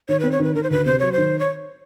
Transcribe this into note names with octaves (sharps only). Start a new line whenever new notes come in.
D#3 C#5
C4 B4
C#5
D#3 B4
D#3 A#4
C5
D2 B4
C3 C5
F#3 C#5
C5
D#3
C#5